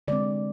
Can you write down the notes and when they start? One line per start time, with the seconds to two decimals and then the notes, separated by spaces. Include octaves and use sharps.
0.08 D3 G#3 C4 D5